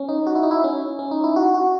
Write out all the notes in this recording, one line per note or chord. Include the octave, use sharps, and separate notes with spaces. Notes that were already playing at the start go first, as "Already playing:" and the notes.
Already playing: C#4
D#4
F#4
E4
D#4
E4
C#4
C#4
D#4
E4
F#4
F#4